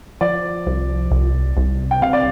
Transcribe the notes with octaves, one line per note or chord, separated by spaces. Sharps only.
F3 D5
C2
C2
C2
G5
C3 F5
D5